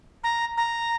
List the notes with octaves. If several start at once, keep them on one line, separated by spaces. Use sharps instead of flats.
A#5
A#5